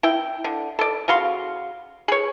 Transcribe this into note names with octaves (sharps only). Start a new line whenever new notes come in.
E4 G5
D3
A4 D5
C#3 F#4 F5 C6
G#4 C#5